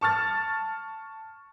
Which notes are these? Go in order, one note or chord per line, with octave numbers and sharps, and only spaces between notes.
A5 C#6 F6 A6